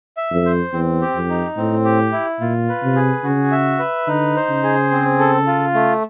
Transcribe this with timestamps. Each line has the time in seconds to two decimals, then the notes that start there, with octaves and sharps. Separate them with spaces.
0.17 E5
0.32 F2
0.46 C5
0.73 E2 C4
1.02 G4
1.15 F2
1.30 D#4
1.57 A2 C4
1.85 G4
2.12 E4
2.40 A#2 F4
2.69 B4
2.83 C3
2.96 G#4
3.24 C#3 F#4
3.51 E5
3.79 B4
4.07 D3 D#4
4.36 C5
4.49 C#3
4.63 G#4
4.91 C4
5.19 A4
5.47 F4
5.74 A3